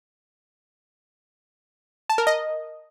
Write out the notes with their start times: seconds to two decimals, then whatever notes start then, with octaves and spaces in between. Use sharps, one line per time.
2.10 A5
2.18 A#4
2.27 D#5